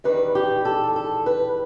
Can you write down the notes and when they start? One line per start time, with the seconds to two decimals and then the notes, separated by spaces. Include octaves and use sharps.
0.04 E2 D#3 G3 B4
0.35 G4
0.65 A4
0.96 A4
1.26 B4